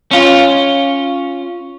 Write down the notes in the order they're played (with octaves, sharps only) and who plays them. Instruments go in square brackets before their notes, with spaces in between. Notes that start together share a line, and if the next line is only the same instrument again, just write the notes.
[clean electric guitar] C#4 F4